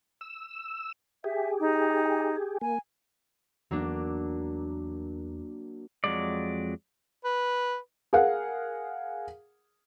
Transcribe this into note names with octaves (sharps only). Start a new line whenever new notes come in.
E6
G4 G#4 E5
D#4
A#3 G#5
E2 F#3 A#3 D4
F2 F#3 G#3 D5
B4
G#4 A#4 F5 F#5